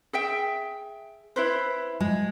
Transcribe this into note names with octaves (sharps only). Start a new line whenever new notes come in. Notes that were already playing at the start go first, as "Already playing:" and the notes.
G#4 E5 G5
E4 B4 C5
G#3